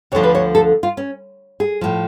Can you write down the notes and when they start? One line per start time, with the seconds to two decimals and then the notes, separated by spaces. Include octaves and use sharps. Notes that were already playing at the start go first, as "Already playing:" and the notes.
0.12 D2 D3 F3 C#5
0.23 B4
0.35 C#5
0.55 A4
0.83 F4
0.97 C#4
1.60 G#4
1.81 A2 F3